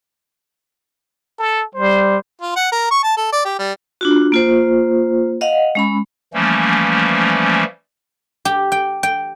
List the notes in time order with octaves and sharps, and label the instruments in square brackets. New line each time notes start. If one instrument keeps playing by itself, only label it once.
[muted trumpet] A4
[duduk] G3 [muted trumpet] C5
[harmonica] F4
F#5
A#4
C#6
A5
A4
D5
G4
G3
[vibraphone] D4 F4 F#4
A#3 F4 C5
D#5 F5 F#5
G#3 C#4 B5
[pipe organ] E3 F3 G3 A3 A#3 C#4
[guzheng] G4
G5
G5